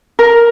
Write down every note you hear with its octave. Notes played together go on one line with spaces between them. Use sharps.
A#4